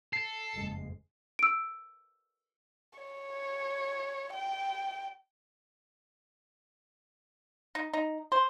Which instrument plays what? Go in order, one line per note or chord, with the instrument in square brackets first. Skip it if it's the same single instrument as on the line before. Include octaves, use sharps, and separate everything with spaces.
[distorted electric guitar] A4 [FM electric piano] C7
[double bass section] F#1 F2 G#3
[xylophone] E6 D7
[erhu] C#5
G5
[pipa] D#4
D#4
C5